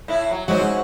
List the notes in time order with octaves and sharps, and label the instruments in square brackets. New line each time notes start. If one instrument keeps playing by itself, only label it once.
[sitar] A2 E4
F#3
[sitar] G#2 C4 F#4 [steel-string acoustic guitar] F#3 G#3
[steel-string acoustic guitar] C#4